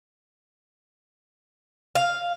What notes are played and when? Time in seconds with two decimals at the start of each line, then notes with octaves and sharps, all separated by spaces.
1.95 F5